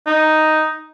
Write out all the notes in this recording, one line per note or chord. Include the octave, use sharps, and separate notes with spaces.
D#4